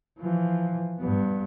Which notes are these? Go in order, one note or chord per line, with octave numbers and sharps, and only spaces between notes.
E3 F3
G2 B3